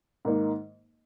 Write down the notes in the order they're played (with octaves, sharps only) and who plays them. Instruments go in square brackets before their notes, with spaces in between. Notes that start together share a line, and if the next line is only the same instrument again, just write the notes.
[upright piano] G#2 D#3 A#3 D#4